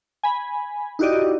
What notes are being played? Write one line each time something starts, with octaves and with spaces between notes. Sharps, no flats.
G#5 B5
D#4 E4 F#4 G4 D5 D#5